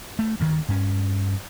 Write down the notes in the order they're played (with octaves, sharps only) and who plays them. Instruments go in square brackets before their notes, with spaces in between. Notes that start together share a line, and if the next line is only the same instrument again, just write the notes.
[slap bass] A3
D2 G2 D#3
G2 C#4